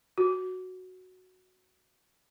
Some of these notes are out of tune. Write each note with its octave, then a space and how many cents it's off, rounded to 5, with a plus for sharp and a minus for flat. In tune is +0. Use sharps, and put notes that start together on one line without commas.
F#4 +0